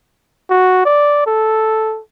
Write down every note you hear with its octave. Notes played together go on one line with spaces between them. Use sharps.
F#4
D5
A4